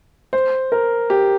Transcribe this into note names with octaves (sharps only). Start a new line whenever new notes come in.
C5
A#4
G4